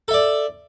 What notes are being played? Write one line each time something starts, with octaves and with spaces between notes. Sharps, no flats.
A4 D5 E5